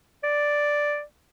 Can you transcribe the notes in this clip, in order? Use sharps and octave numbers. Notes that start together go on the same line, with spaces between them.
D5